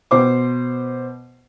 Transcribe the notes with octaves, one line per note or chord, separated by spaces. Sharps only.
B2 C5 D6